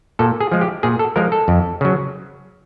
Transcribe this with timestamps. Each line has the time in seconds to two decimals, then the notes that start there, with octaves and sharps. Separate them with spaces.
0.19 A#2 A4
0.40 G#4
0.51 F3 G#3
0.61 G4
0.83 A#2 G#4
0.99 A4
1.16 F3 G#3 A#4
1.32 A4
1.48 F2
1.81 C#3 F#3